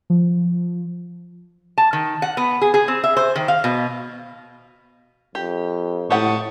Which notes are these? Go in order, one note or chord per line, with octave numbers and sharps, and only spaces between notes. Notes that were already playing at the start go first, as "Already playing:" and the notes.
F3
A5
D#3
F#5
B3
G#4
G#4
C4
E5
C5
D#3
F5
B2
F2 G4
A2 G4 F#5 A5 C#6 D#6